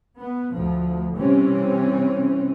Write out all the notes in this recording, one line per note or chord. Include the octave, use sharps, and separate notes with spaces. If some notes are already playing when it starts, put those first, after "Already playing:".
B3
D2 F3
C3 E3 G3 C4 C#4